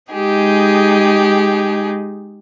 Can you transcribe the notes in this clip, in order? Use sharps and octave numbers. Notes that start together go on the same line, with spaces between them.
G#3 D#4 G4 G#4